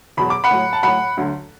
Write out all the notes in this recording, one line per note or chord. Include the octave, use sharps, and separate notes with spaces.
E2 B2 F#3 B5
D6
F#5 B5
A2 F#3
A5
A2 F#3 F#5 B5
D2 D3 F#3